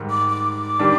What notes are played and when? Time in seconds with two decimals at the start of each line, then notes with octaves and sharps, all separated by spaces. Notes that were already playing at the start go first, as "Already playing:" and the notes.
Already playing: G#2 D#3 G3
0.10 D6
0.28 D6
0.79 D#3 G3 D4 G4